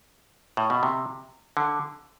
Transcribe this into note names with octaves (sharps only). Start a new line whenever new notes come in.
A2
B2
C3
D3